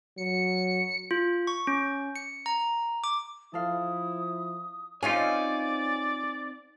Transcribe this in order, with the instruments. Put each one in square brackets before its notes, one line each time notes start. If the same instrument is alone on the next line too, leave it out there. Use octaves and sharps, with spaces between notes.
[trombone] F#3 [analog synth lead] C#7
[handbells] F4
C#6
C#4
C#7
A#5
D6
[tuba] F3 [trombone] E4 [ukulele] A4 F5 [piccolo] D#6
[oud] C4 D#4 F5 [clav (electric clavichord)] C#4 F4 [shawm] D5 [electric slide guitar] G#5